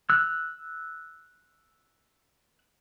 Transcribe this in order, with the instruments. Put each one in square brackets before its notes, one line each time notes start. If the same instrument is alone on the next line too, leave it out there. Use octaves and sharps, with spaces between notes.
[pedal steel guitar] E6 F#6